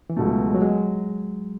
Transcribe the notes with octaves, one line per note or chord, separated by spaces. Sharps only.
E3
C#2 B2 F#3 A3
G#3
F#3
G#3